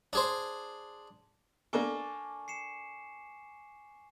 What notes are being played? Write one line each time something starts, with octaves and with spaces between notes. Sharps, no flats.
D4 G#4 C5
A#3 D4 A4 G#5 C#6 D6
C7 C#7 E7